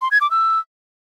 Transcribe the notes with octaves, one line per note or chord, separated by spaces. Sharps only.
C6
G#6
D6
E6